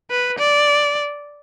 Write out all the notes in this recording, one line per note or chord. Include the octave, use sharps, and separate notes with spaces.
B4
D5